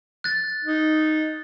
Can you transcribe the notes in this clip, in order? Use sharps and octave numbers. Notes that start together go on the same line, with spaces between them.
F#6 A6
D#4